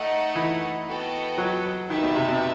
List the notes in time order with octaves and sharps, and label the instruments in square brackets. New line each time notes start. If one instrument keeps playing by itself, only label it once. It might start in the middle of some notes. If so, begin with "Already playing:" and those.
Already playing: [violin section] A3 D#4 A4 D#5 F#5
[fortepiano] E3
[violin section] B3 F#4 A4 D#5 G5
[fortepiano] F#3
[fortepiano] D#3 [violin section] D#4 G4 B4 E5 A5
[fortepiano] B2
C3
B2